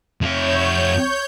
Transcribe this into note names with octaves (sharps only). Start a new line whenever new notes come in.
F2 C#5 E5 G6